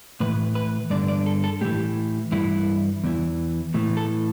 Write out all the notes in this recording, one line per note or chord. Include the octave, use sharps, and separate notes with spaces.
A2 E3 B4
B4
G2 D3 D5
D5
A4
A4
A2 E3 G4
G2 E3 E4
E2 E3
A2 E3
A4